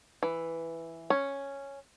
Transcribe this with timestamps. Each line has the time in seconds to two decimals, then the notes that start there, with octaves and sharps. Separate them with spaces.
0.23 E3
1.10 C#4